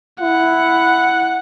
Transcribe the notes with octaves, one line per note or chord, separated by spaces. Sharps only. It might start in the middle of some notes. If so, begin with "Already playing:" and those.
E4 F#5